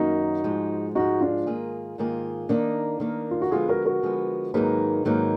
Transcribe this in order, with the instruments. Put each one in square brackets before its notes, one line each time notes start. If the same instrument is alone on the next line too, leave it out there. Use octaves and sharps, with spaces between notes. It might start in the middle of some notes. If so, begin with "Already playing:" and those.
Already playing: [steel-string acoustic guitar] F#2 D#3 A#3 [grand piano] D#4 F#4
[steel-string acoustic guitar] G#2 F3 G#3
[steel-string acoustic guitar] G#2 F3 G#3 [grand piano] D#4 F#4
[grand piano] D4 F4
[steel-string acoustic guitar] G#2 D#3 A#3 F4 G#4
G#2 D#3 A#3 F4 G#4
[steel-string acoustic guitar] D#3 A#3 D#4 [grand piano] D4
[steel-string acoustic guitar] D#3 A#3 D#4
[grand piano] F4
F#4
[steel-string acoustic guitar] D3 F3 G#3 B3 [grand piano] F4 G#4
[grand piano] F#4 A#4
F#4 A#4
[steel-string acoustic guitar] D3 F3 G#3 B3
[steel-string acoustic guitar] G#2 D#3 F#3 A#3 D#4 [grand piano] G#4 B4
[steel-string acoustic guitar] G#2 D#3 F#3 A#3 D#4